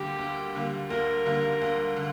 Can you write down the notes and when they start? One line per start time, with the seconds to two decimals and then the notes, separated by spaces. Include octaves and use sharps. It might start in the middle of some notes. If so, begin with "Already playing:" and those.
Already playing: D2 D3 G3 A#3 G4
0.19 D2
0.55 D3 G3 A#3
0.89 D2 A#4
1.25 D3 G3 A#3
1.62 D2
1.96 D3